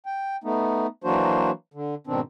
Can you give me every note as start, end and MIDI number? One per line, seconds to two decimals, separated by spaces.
0.06 0.36 79
0.44 0.87 57
0.44 0.87 59
0.44 0.87 63
1.04 1.51 52
1.04 1.51 54
1.04 1.51 58
1.04 1.51 62
1.04 1.51 66
1.04 1.51 72
1.74 1.95 50
2.07 2.21 44
2.07 2.21 47
2.07 2.21 51
2.07 2.21 60
2.07 2.21 62